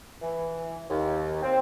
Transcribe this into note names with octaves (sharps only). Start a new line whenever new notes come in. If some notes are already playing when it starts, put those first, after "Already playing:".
E3
D#2
C4